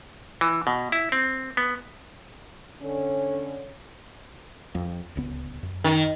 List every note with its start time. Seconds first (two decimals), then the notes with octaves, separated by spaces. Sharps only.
0.41 E3
0.67 B2
0.92 E4
1.12 C4
1.57 B3
2.82 D3 C#4
4.75 F2
5.15 D1 C#2 B3
5.63 F#2
5.84 D#3